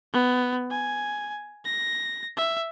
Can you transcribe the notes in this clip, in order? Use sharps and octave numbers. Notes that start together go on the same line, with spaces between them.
B3
G#5
A#6
E5